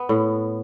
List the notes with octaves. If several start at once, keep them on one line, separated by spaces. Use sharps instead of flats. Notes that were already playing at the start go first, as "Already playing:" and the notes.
Already playing: B3
A2